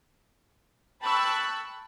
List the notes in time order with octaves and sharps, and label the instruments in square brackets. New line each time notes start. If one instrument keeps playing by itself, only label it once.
[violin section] G5 A5 B5 C#6 E6 F#6